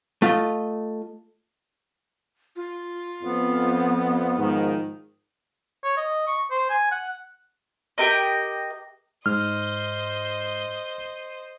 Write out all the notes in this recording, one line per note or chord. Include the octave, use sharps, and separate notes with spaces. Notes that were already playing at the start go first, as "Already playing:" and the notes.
A3 F4 D#5
F4
F2 B3
G#2 D#3 F3
C#5
D#5
C#6
C5
G#5
F#5
G4 A#4 D#5
G#2 C5 D#5 F6